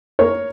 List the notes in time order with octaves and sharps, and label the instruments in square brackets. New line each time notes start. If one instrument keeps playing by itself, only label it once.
[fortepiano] A#3 A#4 C#5